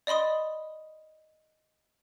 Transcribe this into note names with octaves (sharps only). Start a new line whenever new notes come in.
D5 D#5 B5 C6 D#6